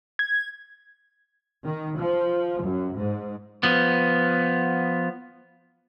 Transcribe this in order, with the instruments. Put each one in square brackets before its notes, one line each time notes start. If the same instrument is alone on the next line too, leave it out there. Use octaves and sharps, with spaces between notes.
[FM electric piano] G#6
[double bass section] D#3
F3
F#2
G#2
[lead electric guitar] F3 B3